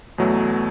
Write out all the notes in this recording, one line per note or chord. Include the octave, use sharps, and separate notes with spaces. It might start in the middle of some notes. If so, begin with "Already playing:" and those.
E2 B2 F#3 A3